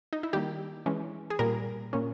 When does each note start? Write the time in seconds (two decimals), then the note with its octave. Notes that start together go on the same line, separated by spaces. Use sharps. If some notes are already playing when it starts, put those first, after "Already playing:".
0.13 D#4
0.23 E4
0.33 D#3 G3 A#3 G4
0.86 E3 G#3 C#4
1.30 G#4
1.39 A#2 G3 A#3 A#4
1.93 A#2 A#3 C#4